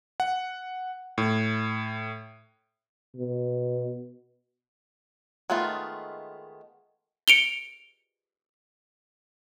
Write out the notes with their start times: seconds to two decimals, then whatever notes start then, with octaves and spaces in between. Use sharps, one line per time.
0.20 F#5
1.18 A2
3.16 B2
5.50 D#3 G#3 A3 B3 F4
7.28 C#7 D7 F7 G7